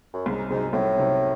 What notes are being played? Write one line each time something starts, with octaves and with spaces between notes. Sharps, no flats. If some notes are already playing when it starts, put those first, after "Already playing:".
F#2
C2 G#2
G#2 C3 F#3 C4 D#4
C2 A2
C3 F#3 C4 D#4